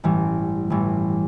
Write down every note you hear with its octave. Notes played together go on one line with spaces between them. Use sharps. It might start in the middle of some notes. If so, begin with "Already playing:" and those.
A1 G2 E3
A1 G2 E3